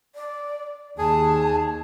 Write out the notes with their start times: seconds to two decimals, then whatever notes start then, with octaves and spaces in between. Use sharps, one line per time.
0.15 D5
0.98 D#2 G#4 A5